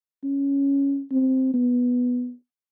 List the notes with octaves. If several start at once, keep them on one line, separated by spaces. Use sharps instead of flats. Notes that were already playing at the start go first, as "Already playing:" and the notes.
C#4
C4
B3